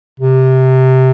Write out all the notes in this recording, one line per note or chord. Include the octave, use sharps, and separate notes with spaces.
C3